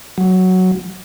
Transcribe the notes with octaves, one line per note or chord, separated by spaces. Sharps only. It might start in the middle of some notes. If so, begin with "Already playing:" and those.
F#3